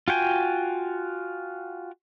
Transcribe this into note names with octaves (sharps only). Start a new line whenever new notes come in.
F4 F#4 G5 G#5